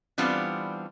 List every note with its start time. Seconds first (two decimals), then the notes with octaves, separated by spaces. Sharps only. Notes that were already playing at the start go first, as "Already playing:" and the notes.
0.18 E3 G3 B3 C4 D4 F4